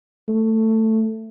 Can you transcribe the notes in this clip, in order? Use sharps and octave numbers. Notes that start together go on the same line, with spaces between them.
A3